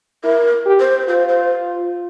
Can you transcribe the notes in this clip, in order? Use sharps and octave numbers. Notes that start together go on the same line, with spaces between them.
E4 A#4
G4
C5
F4 C5
C5